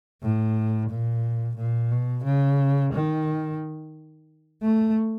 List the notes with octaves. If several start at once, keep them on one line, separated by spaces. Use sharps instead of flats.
A2
A#2
A#2
B2
C#3
D#3
A3